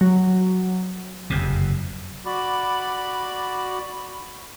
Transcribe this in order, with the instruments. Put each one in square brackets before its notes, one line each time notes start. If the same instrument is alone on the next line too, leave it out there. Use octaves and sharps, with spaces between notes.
[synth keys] F#3
[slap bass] F#1 F2 C3
[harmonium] F#4 D5 [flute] B5